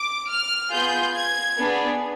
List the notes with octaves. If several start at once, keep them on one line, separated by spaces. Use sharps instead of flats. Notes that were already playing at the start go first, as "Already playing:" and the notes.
Already playing: D6
F6
B3 F4 G#4 G6
G#6
B3 D4 G#4